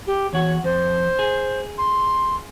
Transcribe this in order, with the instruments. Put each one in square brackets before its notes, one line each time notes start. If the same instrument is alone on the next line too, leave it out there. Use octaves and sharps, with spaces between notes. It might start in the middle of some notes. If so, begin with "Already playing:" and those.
[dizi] G4
[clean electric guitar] E2 F#4 [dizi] C#5
[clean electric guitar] F2 [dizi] C5
[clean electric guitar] G#4
[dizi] C6